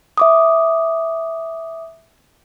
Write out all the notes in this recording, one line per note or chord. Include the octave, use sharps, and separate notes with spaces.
E5 D6 D#6